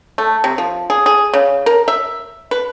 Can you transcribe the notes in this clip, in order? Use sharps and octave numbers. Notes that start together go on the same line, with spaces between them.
A3
C3
F3
G#4
G#4
C#3
A#4
E5
B4